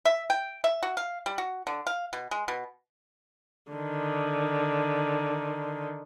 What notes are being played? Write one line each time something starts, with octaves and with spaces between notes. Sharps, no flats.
E5
G5
E5
F#4
F5
G3
F#4
D3
F5
B2
G#3
B2
D3 D#3